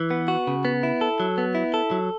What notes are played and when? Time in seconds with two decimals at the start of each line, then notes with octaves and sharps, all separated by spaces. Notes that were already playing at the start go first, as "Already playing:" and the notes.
Already playing: E3
0.10 B3
0.28 F#4
0.47 C#3
0.65 B3
0.83 E4
1.01 A4
1.20 F#3
1.38 B3
1.55 E4
1.74 A4
1.91 F#3